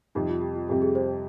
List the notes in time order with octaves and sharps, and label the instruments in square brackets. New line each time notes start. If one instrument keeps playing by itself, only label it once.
[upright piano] F2 C3 G3 [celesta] D#4
[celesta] F4
G4
F4
[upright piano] F2 C3 G3 [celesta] G4
[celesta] G#4
C5